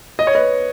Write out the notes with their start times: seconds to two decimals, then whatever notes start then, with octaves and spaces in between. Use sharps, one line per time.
0.19 D#5
0.27 C#5
0.35 B4 D#5